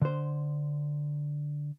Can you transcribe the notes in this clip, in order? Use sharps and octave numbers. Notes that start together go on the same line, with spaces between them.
D3 C5